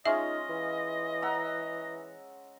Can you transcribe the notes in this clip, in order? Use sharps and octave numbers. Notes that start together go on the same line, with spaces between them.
G#3 C#4 D#4 F4 D#5 E5
E3
F#5 A#5 E6